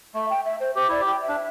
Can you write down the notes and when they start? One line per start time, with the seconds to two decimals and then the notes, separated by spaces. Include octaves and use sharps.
0.14 A3 E5
0.30 G5
0.45 E5
0.60 C5
0.75 G4 C5
0.88 E4 D5
1.00 G4
1.06 G5
1.22 E5
1.28 D4